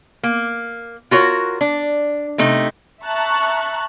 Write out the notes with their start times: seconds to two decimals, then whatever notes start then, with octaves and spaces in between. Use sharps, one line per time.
0.23 A#3
1.11 F4 F#4 A#4 C#5
1.61 D4
2.38 C3 A3 D#4
3.04 E5 A5 A#5 C#6 F#6